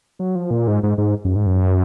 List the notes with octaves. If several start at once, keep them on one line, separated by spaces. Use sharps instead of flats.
F#3
F3
A#2
G#2
G#2
G#2
F#2
G#2
F#2